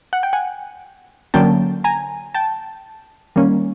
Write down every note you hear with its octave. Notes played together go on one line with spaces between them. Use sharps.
F#5
G5
F#5 G#5
D3 F#3 A#3 C#4 G5 A5
G#5 A#5
G5 A5
D#3 G3 A#3 C#4